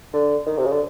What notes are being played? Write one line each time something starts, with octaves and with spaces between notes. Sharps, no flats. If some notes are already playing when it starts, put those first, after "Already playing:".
D3
D#3
C3
C#3
D3